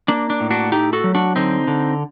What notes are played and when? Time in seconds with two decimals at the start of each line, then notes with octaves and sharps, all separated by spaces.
0.08 A#3 D4
0.30 D4
0.40 A2
0.50 D4 F#4
0.72 A3 D#4 G4
0.93 F#4 A4
1.04 F#3
1.15 D4 F#4
1.36 D3 C4 D#4
1.67 D3